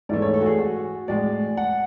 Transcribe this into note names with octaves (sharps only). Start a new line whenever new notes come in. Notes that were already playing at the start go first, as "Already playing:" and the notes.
G#2 E3 A3 D5
C#5
A4
F#4
G#4
F#4
A2 G#3 D5
F#5